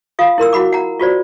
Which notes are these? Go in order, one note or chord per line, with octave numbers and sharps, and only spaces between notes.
F4 F5 D#6
E4 A#4 C6 E6
E4 F#4 F#5 B5 D6
F#5 A#5
F4 F#4 C5 D5